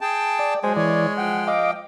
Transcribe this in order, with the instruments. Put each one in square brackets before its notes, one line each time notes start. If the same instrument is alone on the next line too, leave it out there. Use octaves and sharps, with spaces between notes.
[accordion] G#4 G5 A5
[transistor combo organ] D5
[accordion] F#3 [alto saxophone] G#3 [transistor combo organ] C5 G#5
[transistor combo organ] E3 D5 [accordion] C#5
[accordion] F3 G5 [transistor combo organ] F#5
[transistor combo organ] D#5 F5 D6